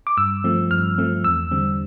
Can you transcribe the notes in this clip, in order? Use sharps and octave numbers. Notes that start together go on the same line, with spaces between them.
D6
G2 E6
F3 A3 C4
G2 F6
F3 A3 C4
E2 E6
D3 G3 C4